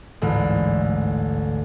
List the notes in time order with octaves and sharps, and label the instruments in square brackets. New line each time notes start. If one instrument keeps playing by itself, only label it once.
[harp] A1 D2 G#2